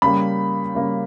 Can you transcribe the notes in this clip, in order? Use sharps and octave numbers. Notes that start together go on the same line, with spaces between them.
C#3 G3 A#3 B5
C#3 G3 A#3